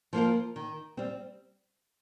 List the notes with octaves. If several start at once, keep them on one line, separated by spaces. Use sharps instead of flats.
F3 A#3 F4 A#4
D#3
G3 C4